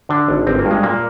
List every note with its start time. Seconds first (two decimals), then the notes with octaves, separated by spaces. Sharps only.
0.09 D3 D4
0.28 G#1
0.47 G1 C4
0.59 A#3
0.65 G2
0.71 G#3
0.83 A#2 A#3